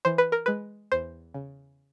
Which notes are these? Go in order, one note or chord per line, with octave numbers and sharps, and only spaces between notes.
E3 C5
B4
A#4
G#3 B4
E2 C5
C#3